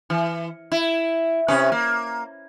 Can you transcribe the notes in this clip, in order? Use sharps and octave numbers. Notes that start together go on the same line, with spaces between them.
E3
E4
C3 C#4 B4
A#3